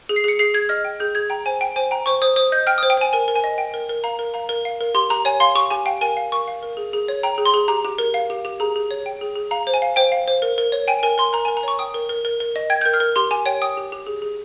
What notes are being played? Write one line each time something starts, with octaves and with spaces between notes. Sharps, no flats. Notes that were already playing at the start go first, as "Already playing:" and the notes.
G#4
C7
G#4 C#7
G#4 C7
G#4 G#6
D#5 F6
G5
G#4 G6
G#4 G#6
G5 A#5
C5 G#5
G5
C5 G#5
G5 A#5
C5 C#6
C5 D#6
C5 D#6
D#5 G6
G5 F6
D#6
C5
G5
C5 G#5
A#4 G#5
A#4
G#5
D#5
G5
A#4
A#4
F5 A#5
A#4
F5 A#5
A#4
F5
A#4
G4 C6
G4 A#5
C#5 G#5
F5 C6
G4 C#6
G4 G#5
F5 G5
A#4 G#5
F5
A#4 C#6
F5
A#4
G#4
G#4
C#5
G5 A#5
G#4
C6
G#4
G4 A#5
G4
A#4
F5
G4
G4
G#4 A#5
G#4
C#5
G5
G#4
G#4
F5 A#5
C5
G#5
F5
C5 G5
F5
C5
A#4
A#4
C#5
G5 G#5
A#4 G#5
A#4 C6
A#4 A#5
G#5
A#4
A#5
C#5 C#6
G5 D#6
A#4
A#4
A#4
A#4
D#5
G5 G#6
G6
A#4
F6
A#4
G4 C6
G4 G#5
C#5 G5
G5 D#6
G4
G4
G#4
G#4